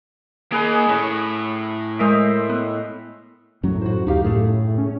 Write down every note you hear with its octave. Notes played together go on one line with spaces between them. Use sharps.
A#3 G#4 B4 D#5
A2 C#4
G#3 A#4 C5 D#5 E5 D7
B3
F#2 A2 F#3 C#4
F#4 C5
D2 D#4 G4 F5
A2 A3 G#4
C#4